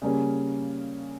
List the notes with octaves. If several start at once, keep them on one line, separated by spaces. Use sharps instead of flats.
C#3 G3 A#3 C#4